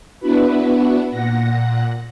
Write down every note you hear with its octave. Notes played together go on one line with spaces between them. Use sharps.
B3 D4 E4 F#4 B4
A#2 F#5 A#6